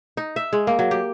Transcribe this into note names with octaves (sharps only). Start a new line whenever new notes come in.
D#4
E5
G#3
A#3
F#3
G4